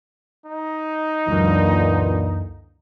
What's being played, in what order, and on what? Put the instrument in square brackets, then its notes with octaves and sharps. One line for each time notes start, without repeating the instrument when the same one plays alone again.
[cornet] D#4
[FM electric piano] C#2 F#2 [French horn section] A#2 D3 E3